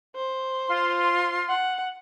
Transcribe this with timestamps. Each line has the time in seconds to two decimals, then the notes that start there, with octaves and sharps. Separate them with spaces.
0.16 C5
0.68 F4 C6
1.49 F#5